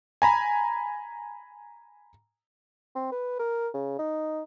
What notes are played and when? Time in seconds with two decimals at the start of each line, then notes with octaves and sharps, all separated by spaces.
0.22 G#5 A#5 B5
2.95 C4
3.11 B4
3.39 A#4
3.74 C#3
3.99 D#4